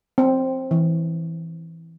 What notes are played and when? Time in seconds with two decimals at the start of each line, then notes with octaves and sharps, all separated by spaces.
0.18 C4
0.71 E3